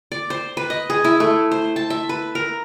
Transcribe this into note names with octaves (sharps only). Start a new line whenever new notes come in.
D5
C5
B4
D#5
G#4
E4
A3
C5
A5
E5
B4
A#4